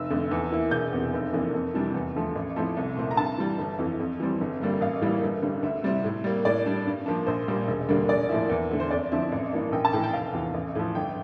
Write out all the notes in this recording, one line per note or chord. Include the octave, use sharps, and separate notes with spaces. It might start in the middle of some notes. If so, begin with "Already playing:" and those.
Already playing: F1 E6
F2 D3 A3
E2
E3 A#3 E4
E1 G6
E2 C3
F1
F2 E3 A#3 D4
F2
C3 E3 G3 D4
E2
D3 F3 A3
A1
A2 F3 A3 C4
C2
A#2 A3 C4 E4
A#5
G2 A5
E3 G3
G1
F2 E3
F2
E3 G3 C4
G1
G2 D3 G3 A#3
A1 F5
A2 E3 G3 A#3
G1
G2 D3 G3
D2 E5
C3 G3 C4 E4
A2
G3 A#3
A2 D5
G3 D4
G2
F3 A#3 D4
A#1 C5
A#2 G3 A#3
E1
D2 D3 G3 A#3
A#1 D5
A2 F3 A#3 E4
E2
D3 A3 E4
C5
F2 D5
D3 F3 C4 E4
A1
G2 E3 A#3 D4
A#1 G5
A5
A2 E3 G5
G5
F1 F5
E2 E3
A1
A2 F3
G1 G5